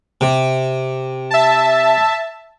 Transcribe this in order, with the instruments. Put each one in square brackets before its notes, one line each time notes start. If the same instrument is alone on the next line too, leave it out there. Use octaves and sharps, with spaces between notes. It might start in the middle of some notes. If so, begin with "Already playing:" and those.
[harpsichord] C3
[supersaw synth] E5 A5